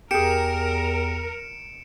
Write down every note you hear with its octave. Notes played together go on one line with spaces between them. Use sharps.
E2 G4 G#4 A#4 C#7 D7 E7